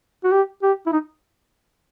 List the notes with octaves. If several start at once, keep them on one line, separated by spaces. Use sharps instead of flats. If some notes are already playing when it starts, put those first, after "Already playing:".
F#4
G4
G4
E4
D#4